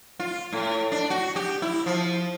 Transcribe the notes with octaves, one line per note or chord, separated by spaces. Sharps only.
F4
A2
D4
F#4
G4
E4
F3